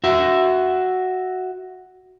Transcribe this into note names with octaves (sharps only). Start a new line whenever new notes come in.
F#4 E5